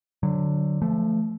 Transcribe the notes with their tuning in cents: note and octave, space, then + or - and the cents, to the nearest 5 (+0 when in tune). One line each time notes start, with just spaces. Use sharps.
D3 +0 F#3 -15
F3 -25 A3 +0